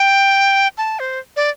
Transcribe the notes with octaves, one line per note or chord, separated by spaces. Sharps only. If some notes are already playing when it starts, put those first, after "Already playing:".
Already playing: G5
A5
C5
D5